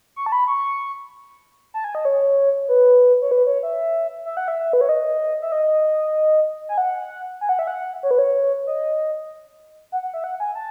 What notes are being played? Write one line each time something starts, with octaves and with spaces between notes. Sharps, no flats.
C#6
A5
B5
C#6
A5
G#5
D#5
C#5
B4
C#5
B4
C#5
E5
E5
F#5
E5
B4
C#5
D#5
E5
D#5
G#5
F#5
G#5
F#5
E5
F#5
C#5
B4
C#5
D#5
F#5
F#5
E5
F#5
G#5
A5